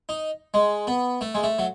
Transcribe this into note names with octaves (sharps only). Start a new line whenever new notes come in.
D#4
G#3
B3
A3
G#3
A3
F#3